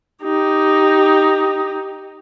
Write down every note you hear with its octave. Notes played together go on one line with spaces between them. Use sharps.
D#4 G4